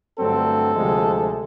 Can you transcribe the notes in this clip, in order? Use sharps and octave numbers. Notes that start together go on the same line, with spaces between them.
G2 D3 F#3 A3 C4 A4
D2 C3 F3 G#3